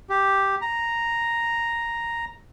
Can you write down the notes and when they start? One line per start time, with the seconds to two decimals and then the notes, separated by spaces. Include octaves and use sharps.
0.09 G4
0.61 A#5